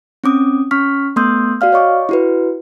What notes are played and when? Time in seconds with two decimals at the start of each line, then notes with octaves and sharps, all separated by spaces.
0.24 C4 C#4 D6 D#6
0.71 C#4 C#6 F6 B6
1.16 A3 B3 C6 D#6 E6 G6
1.61 F#4 D5 F5 F6
1.73 C#5 D#5 C#6 D6
2.09 E4 F#4 B4